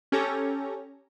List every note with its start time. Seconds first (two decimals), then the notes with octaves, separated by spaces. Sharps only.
0.12 C#4 G4 A4 C#5 A#5